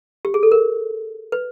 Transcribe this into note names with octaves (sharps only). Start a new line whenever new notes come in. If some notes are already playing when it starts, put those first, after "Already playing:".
G4
G#4
A4
A#4
B4